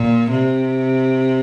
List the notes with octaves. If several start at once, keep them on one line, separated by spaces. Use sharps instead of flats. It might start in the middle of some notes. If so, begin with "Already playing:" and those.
Already playing: A#2
C3